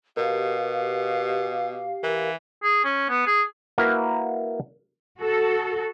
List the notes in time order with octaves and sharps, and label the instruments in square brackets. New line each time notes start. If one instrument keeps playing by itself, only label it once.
[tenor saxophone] B2 [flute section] G4 F5 [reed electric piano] A#4
[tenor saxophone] E3 [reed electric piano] A#4
[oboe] G#4
C#4
B3
G#4
[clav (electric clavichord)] A#3 E4 F#4 A#4 B4
[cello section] F#4 A4